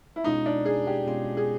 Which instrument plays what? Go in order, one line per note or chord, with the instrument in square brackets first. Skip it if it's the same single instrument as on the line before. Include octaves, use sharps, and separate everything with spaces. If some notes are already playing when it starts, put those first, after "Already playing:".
[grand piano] E4
[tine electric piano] B2 G#3 C#4 F4 [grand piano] D#4
[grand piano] D4
G#4
G4
[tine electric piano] B2 G#3 C#4 F4
[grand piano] G#4